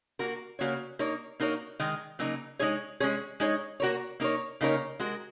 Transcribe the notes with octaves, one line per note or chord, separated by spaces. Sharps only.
A#3 F#4 A#4
C#3 A#3 F#4 C#5
A#3 D#4 A#4 C#5
A#3 D#4 F#4 A#4 C#5
D#3 G#3 D#4
C#3 F#3 A#3 D#4
G#3 D#4 G#4 C#5
G#3 C#4 G#4 C#5
G#3 D#4 G#4 C#5
A#3 F#4 A#4 C#5
A#3 D#4 A#4 C#5
C#3 A#3 D#4 A#4 C#5
G#3 F#4 A#4